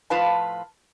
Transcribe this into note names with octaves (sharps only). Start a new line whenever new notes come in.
A2 F3 F4 B4 F5 A5